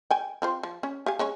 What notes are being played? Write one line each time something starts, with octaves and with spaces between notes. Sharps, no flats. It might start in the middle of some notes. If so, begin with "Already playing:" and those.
G5 G#5
C4 F4 C5
F3
C#4
G4 F5 G#5
G#3 C#4 C#5